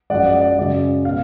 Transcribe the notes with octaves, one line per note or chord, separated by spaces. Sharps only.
F#2 F3 G#3 D5 F#5
D5 F#5
D5
F#2 C#3 G#3 D5
B2 G#3 F5